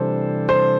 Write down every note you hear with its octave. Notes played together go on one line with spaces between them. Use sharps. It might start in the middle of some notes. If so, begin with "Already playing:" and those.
Already playing: C3 E3 G3 D4 A4 C5
C5